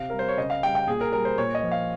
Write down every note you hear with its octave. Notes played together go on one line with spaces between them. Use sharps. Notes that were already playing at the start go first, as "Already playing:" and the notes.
Already playing: C3 F5
G3 A#4
C5
C#5
C#3 D#5
F5
G3 G5
G5
A#2 G#4
A#4
G3 A#4
C5
A#2 C#5
D#5
F3
F5